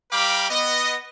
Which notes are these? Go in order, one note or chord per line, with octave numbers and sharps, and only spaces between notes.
G3 A#4 F5 G5 B5 D6
B3 D#5